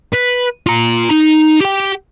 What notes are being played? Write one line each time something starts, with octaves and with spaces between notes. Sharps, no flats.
B4
F4 A#5
D#4
G4 G5